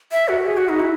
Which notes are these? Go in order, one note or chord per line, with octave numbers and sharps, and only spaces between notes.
E5
F#4
G#4
F#4
D#4
E4